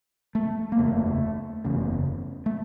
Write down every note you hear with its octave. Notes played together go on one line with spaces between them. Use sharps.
A3
A#3
F#1 E2 C#3 A3
F#1 E2 C#3
A3